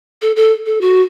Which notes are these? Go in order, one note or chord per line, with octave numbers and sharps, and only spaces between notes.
A4
A4
A4
F#4